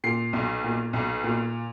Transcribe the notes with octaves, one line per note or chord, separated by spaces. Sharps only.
A#2 C7
B1
A#2
B1
A#2